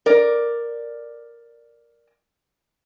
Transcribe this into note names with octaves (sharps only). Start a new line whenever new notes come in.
A#4 D5